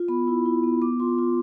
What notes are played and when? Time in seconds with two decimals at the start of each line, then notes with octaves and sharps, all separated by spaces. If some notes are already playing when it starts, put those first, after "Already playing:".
Already playing: F4
0.08 B3 B5
0.27 E4
0.46 E4
0.64 B3
0.82 B3 D6
1.00 F4 C6
1.18 F4